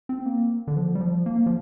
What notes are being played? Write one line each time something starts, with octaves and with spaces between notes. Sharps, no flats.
C4
A#3
D3
F3
G3
F3
A#3
F3